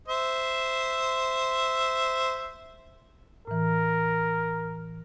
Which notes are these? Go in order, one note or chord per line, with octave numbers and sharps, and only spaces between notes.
C5 E5
A2 E3 A#4